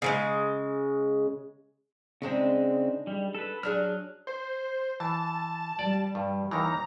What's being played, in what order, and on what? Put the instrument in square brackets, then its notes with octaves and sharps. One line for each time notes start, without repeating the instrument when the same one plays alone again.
[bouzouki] C#3 E3 G#3
[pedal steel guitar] C#3 C4 [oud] G#3 D4 D#4
[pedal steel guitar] G3
A4 B4
[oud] F#3 D4 G#4 [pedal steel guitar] F6 F#6
[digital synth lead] C5
[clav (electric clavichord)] E3 [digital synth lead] A5
[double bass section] G3 [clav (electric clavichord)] D5
[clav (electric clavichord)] G2
[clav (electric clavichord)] D#2 D#3 E3 [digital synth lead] A#5